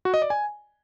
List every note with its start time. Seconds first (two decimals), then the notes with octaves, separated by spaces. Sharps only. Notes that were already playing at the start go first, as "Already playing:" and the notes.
0.05 F#4
0.14 D#5
0.22 D5
0.30 G#5